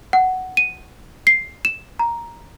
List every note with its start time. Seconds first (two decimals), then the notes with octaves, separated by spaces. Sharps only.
0.13 F#5
0.57 D#7
1.27 C7
1.65 E7
1.99 A#5